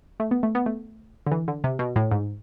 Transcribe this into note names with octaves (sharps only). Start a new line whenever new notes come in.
A3
B3
A3
B3
A3
D3
E3
D3
C3
B2
A2
G#2